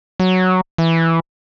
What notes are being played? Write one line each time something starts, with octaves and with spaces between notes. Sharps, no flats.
F#3
E3